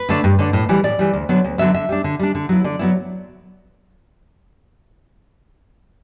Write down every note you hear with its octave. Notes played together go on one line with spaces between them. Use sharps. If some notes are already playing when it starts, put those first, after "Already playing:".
Already playing: B4
D3 A3 D4
G2
D3 A3 D4
A2
E3 G3
A2 D5
E3 G3
D2
D3 F#3 B3
D2
D3 F#3 B3 E5
D3 E5
G3 D4
D3
G3 D4
D3
F#3 B3 E4
D3 D5
F#3 B3 E4